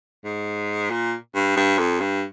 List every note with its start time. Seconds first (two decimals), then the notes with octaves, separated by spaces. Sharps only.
0.25 G#2
0.91 A#2
1.35 G2
1.56 G2
1.78 F2
2.00 G2